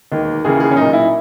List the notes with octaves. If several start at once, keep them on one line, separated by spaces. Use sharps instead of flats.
E1 D#2 D#3
D#2 C#3 E3 G#4
G#4
C#4
B1 A#2 D#4
E4